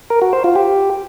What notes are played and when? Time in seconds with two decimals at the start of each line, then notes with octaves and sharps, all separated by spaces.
0.10 A#4
0.22 F#4
0.33 C5
0.44 F4
0.56 G4